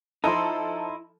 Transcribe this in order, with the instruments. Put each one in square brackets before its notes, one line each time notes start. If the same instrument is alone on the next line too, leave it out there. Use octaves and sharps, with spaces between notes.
[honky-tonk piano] F3 A4 [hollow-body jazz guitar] D#4 E4 [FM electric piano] A#5 C6